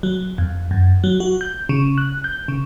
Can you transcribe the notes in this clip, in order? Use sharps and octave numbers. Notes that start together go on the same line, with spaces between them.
F#3
F2
F#2
F#3
F#4
G6
C#3
F#6
G6
C#3